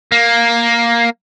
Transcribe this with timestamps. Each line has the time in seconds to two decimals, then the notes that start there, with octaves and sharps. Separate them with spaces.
0.12 A#3